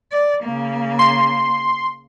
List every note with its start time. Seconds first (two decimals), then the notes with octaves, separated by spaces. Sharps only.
0.12 D5
0.44 C#3 A#3
0.99 C6